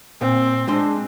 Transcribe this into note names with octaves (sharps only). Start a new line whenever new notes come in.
A#2 C4
G#3 D4 G#4 C5